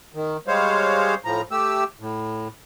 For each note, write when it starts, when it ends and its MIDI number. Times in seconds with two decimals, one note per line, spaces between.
0.15 0.37 51
0.47 1.14 55
0.47 1.14 56
0.47 1.14 72
0.47 1.14 73
0.47 1.14 77
1.25 1.41 45
1.25 1.41 53
1.25 1.41 82
1.51 1.84 57
1.51 1.84 67
1.51 1.84 88
2.00 2.48 45